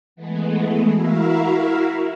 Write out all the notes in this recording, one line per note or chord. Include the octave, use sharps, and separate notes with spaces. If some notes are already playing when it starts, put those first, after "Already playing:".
E3 G#3 A3 B3
E4 F#4 A#4 E5 F5